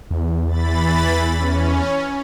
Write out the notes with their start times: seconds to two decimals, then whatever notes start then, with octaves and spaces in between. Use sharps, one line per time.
0.11 E2
0.48 E3 B5 A6
1.37 C#4